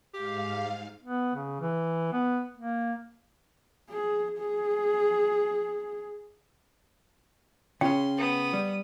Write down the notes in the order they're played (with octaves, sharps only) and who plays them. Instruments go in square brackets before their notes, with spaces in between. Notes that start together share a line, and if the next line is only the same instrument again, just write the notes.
[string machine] G#2 F5 [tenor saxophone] G4
[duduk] B3
C#3
E3
B3
A#3
[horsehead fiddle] G#4
G#4
[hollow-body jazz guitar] C#3 C#4 [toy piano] G5 [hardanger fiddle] C6
[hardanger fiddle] B3 D#6
[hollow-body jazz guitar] G3